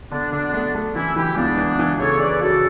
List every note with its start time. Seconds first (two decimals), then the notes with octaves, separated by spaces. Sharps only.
0.11 D3 B3 D4
0.32 D3 B3 D4
0.53 A3 B3 D4
0.75 A3
0.95 E3 C#4 E4
1.16 E3 E4 G4
1.36 C#2 B3 D4
1.57 E3
1.79 E3
1.99 C#3 A4 C#5
2.20 C#3 B4 D5
2.41 C#3 F#4 A4